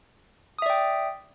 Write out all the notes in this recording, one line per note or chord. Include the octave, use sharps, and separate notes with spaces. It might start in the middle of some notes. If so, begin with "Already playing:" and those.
D5 E5 G5 D#6